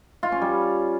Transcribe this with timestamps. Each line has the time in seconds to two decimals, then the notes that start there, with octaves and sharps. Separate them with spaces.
0.23 F4
0.32 C#4
0.41 G3